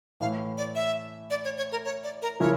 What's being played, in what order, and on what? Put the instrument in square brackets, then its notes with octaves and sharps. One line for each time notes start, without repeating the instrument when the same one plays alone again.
[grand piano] A2 E3 A3 E4 [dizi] F5
[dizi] D5
E5
D5
C#5
C#5
A#4
C#5
D5
A#4
[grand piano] C#3 F3 C#4 E4 A#4 [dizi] C#5